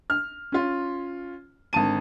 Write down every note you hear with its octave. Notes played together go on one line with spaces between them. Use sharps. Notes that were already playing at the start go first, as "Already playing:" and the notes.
F6
C#4 F4
G#1 D3 A5 D#7